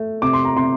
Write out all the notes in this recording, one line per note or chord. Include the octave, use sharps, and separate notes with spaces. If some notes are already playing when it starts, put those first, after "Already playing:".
Already playing: A3
C3 D6
C6
A#5
C3 C6